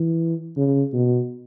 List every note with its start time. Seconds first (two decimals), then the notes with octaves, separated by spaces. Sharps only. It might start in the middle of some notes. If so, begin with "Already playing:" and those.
Already playing: E3
0.57 C#3
0.93 B2